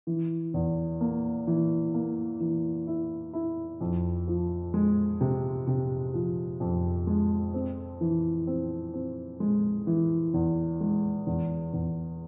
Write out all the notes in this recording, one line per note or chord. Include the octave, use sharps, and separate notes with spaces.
E3
E2
A#3
E3
A#3
E3
E4
E4
F2
F3
G#3
C3
C3
F3
F2
G#3
C4
E3
C4
C4
G#3
E3
E2
G#3
E2
E2